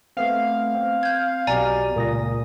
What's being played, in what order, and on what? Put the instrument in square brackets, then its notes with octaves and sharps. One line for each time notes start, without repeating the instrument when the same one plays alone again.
[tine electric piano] A3 B3 C4 [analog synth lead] F5
[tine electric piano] C4
[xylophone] G6 G#6
[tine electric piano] B1 B2 G4 [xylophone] D5 G#5 A#5
[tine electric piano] C#2 D#6 A#6 [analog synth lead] A#2